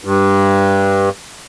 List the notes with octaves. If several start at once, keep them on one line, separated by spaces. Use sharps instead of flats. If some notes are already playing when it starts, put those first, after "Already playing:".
G2